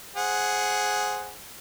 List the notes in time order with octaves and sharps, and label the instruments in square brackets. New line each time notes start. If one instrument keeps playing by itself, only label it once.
[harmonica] G#4 C5 F#5